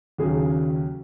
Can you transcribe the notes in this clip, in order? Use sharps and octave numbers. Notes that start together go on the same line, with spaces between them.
D#2 C#3 F#3 G#4